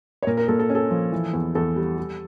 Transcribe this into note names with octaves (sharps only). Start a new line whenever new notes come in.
C#5
A#2 A#4
A#4
A#2 A4
A4
C#4
A4
F3
E3
E2
E2 A4
G3
G3